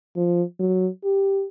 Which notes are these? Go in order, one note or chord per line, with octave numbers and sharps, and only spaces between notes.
F3
F#3
G4